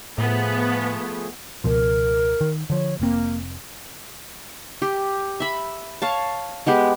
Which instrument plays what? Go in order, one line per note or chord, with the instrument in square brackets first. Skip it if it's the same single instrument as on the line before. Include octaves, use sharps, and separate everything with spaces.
[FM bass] A2 [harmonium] F3 A3 G#4 [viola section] B3
[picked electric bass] C#2 B2 F3 [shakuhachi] A#4
[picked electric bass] D#3
[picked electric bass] D3 F3 [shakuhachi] C#5
[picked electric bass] F1 C4 [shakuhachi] A#3
[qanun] G4
E5 B5
C#5 F5 A5
G#3 B3 G4